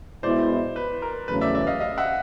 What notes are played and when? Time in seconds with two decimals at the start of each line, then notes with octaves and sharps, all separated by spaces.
0.23 B2 G#3 B3 E4 C5 D5
0.76 B4
1.02 A#4
1.28 E2 C#3 F#3 A3 C#4 B4
1.41 D5 E5
1.55 D5 E5
1.67 D#5 F5
1.80 D#5 F5
1.98 E5 F#5